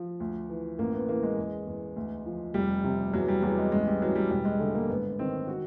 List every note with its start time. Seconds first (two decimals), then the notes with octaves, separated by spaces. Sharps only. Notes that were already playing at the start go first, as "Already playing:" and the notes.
Already playing: F3
0.20 D2
0.49 E3
0.78 A1 A#3
0.94 B3
1.09 E3 A#3
1.23 G#3
1.37 E2
1.67 E2
1.96 D2
2.26 F3
2.54 F1 G3
2.84 C3
3.13 E2 F#3
3.28 G3
3.42 E2 F#3
3.58 G#3
3.72 A1 G#3
3.87 G3
4.01 E3 F#3
4.15 G3
4.30 E1 G3
4.45 G#3
4.60 D3 A3
4.75 A#3
4.89 G#1 B3
5.19 D#3 C4
5.47 F#4